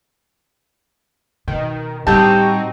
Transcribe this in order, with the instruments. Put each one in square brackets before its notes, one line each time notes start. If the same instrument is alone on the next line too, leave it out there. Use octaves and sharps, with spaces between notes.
[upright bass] B2 [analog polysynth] D#3
[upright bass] A2 G3 [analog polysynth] C4 D#4 F#4 [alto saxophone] G4 [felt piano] A5